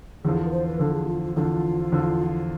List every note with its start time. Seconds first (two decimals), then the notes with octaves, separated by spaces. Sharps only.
0.24 E2 D3 F3 G#4
0.46 B4
0.52 C5
0.67 B4
0.80 E2 D3 F3 A4
0.94 G#4
1.07 F4
1.22 F4
1.36 E2 D3 F3 F4
1.92 E2 D3 F3